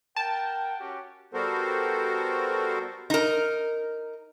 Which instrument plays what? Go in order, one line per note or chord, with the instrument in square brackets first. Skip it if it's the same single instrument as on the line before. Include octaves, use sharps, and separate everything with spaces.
[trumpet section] A#4 F#5 G5 [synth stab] A5
[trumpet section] C#4 F#4 G4
[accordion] G3 B3 F#4 A4 A#4 C5
[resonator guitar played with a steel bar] D#4 A#4